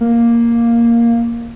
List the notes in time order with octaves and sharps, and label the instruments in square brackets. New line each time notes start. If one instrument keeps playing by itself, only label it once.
[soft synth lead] A#3